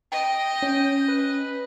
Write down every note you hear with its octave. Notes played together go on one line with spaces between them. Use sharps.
D#5 G5
C#4
B4